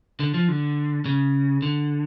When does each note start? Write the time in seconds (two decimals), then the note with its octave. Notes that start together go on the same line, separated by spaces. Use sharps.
0.20 D3
0.34 F3
0.48 D3
1.06 C#3
1.62 D3